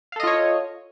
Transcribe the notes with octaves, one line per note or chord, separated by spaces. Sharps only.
F4 A4 C#5 D#5 F5